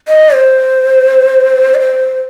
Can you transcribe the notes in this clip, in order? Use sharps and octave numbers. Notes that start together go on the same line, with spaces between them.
D#5
C5
D#5
C5